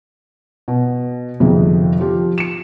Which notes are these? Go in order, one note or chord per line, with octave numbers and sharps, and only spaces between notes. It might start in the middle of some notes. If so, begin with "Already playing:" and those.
B2
G1 F2 C3 D#3 G#4
F3 F4 G4
C#7 E7